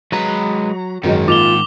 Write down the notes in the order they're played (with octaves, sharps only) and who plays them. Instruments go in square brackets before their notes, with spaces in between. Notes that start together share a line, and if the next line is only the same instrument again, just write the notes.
[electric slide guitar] F#3 A#5 [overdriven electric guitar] G#3 B4
[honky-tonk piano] F#1 F#3 D#5 [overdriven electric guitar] G#2 D#3
[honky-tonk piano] A#3 [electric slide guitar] F4 [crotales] D6 F7 G7